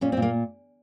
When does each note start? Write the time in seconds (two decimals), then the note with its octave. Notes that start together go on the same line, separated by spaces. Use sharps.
0.01 A#2 C#4
0.12 C4
0.17 A#2
0.22 A#3